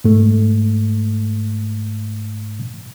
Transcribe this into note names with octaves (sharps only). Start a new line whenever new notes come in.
G#2 A3